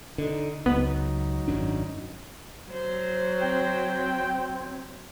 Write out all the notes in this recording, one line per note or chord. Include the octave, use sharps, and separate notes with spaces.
D3 D#4
C#2 F#3 B3 D#4
G#1 F#2 D4
F#3 C5
C4 G5